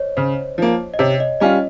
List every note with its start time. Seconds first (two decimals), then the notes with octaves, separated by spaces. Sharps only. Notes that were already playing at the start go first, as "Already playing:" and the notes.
Already playing: C5 C#5 D#5
0.17 C#3 C5
0.58 F3 A#3
0.94 D#5
0.99 C3 C#5
1.20 D#5
1.40 G3 C#4 F4 D#5